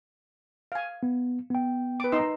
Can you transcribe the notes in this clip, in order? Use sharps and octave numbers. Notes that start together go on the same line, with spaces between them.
F5 G#5
B3
B3 G5
B4 D6
D#4 C6 E6